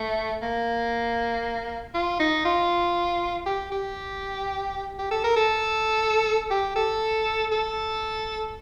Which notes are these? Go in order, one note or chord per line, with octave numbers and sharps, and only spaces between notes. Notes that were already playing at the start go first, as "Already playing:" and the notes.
Already playing: A3
A#3
F4
D#4
F4
G4
G4
G4
A4
A#4
A4
G4
A4
A4